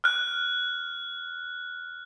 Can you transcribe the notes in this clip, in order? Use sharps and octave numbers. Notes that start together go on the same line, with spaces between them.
F6 F#6